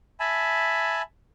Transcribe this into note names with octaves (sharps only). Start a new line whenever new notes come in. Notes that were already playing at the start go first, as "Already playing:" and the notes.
E5 G#5 A5 B5